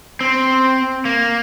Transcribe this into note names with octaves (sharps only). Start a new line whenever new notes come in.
C4
A#3